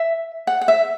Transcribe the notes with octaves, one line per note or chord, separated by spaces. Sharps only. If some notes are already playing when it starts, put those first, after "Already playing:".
Already playing: E5
F#5
F#5
E5